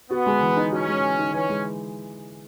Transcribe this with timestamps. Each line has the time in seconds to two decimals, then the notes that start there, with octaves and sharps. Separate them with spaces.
0.10 B3 F#4
0.26 G#3
0.41 E3
0.57 D#4
0.72 C#4 F#4
0.88 G#3
1.03 E3
1.19 D#4
1.34 E3 C#4
1.49 G#3